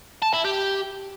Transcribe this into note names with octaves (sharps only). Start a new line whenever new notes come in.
A5
E4
G4